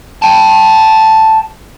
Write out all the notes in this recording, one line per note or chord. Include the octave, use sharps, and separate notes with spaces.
G5 A5